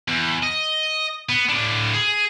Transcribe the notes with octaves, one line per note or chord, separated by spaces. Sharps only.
E2
D#5
B3
A2 D4
G#4